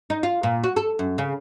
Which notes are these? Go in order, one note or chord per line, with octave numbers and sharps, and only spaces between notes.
D#4
F4
A#2
F#4
A4
F#2
C#3